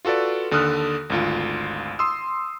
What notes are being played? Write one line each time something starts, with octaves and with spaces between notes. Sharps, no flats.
F4 F#4 A4 B4 D5
D#2 D3 A4 D#6 F6 F#6
G#1 D2 F4
C6 D#6 E6